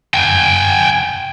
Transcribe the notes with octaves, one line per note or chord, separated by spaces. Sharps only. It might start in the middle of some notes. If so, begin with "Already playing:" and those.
G5 G#5